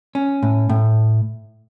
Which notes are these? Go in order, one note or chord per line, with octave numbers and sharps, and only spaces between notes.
C#4
A2
A2